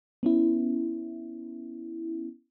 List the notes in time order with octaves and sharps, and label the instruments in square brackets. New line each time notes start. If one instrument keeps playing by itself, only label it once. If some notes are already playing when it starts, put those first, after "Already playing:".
[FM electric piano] B3 C#4 E4